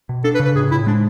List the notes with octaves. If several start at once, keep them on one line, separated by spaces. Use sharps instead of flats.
B2
D4 A4
B4
C#3
B4
A2 G#4
A2 E4
G#3 D4